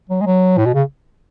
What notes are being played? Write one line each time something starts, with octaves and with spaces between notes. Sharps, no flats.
F#3
G#3
F#3
A2
B2
C#3